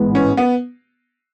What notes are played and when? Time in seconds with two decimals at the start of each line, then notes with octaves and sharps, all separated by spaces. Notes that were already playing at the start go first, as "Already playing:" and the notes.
Already playing: A1 G#2 E3 G#3 B3
0.15 C#4
0.37 B3